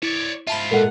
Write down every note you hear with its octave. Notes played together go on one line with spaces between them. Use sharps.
E4 C#5 D5
G#2 F4 E5 A5 B5
A#2 G#3 A4 A#4 F#5